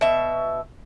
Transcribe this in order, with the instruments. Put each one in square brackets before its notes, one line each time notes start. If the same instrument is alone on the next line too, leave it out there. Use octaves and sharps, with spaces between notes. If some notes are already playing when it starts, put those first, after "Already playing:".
[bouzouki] B2 E5